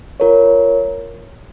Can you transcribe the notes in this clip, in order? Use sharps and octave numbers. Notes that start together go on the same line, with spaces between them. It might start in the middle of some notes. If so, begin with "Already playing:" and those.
F4 A#4 C#5